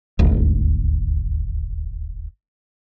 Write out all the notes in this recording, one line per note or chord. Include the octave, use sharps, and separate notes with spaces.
D#1 G#1 D2